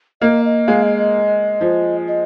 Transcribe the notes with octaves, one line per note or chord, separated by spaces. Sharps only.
A#3 D#5
D#5
G#3 F5
D#5
D#5
F3
D#5